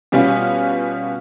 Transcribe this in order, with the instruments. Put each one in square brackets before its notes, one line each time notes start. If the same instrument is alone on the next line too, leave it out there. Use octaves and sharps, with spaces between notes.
[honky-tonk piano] B2 G3 B3 C#4 F4